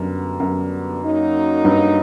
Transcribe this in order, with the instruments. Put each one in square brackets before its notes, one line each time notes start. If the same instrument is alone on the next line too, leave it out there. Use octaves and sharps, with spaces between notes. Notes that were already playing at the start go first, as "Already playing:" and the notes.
Already playing: [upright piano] F#2 [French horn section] D3 G3 B3 D4
[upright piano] F#2
[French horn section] F#3 A#3 D#4
[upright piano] G2